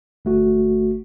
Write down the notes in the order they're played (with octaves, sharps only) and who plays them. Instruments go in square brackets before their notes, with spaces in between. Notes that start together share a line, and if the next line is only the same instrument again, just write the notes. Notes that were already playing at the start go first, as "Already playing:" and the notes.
[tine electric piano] G1 A3 F#4